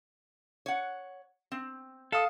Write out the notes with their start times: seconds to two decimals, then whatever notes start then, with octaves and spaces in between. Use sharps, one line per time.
0.66 C#5 F#5
1.52 C4
2.12 A4 F5 D#6